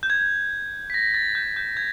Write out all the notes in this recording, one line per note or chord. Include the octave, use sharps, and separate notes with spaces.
G6
G#6
B6
A#6
A6
G6
G6
G#6